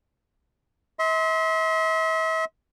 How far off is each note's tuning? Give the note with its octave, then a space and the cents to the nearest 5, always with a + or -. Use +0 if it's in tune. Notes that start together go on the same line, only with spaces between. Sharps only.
E5 -40 C6 +0